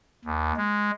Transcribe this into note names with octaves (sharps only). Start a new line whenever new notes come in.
D#2
G#3